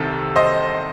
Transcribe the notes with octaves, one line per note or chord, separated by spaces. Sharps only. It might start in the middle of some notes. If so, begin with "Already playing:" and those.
Already playing: C2 C3 D#3 A4
C5 D#5